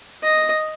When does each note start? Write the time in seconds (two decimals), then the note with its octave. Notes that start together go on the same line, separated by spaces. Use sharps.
0.24 D#5